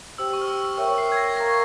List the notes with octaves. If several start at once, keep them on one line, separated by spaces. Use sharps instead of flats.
G4 C5 G5 E6
C#6
F6
E6
A#4 C#5 E5 G5 C#6 E6
C7
G#6
A#6
A#4 F5 A#5 C#6 A#6